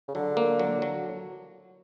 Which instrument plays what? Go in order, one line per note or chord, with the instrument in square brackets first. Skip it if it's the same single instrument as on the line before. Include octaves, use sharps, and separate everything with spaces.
[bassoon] C#3
[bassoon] D3 [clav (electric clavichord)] F#3
[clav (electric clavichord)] A#3
F#3
F#3